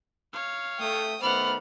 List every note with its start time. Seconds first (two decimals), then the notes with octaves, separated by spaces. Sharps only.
0.33 C#5 F5
0.79 A3 G5 D#6
1.22 D#3 A3 B3 C5 D5 F#5 B5 F6